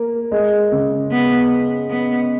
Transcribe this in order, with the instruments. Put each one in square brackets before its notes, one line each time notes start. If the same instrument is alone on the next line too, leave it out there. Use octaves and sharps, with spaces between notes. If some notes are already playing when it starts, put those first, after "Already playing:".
Already playing: [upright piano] A#3
G#3
C#3
[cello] B3
B3